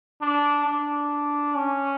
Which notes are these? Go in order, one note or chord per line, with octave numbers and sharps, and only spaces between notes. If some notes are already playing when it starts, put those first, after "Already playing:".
D4
D4
C#4